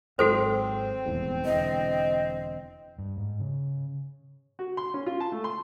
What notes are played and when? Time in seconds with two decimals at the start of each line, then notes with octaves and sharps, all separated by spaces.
0.19 G#1 G#2 F#3 C4 F#4 A4 C5
1.06 D#1 E2 G#2
1.45 E1 D3 E3 D#5
2.98 G2
3.17 G#2
3.40 C#3
4.59 F#4
4.77 C6
4.94 C#4
5.06 F4
5.20 A5
5.32 A3
5.44 C6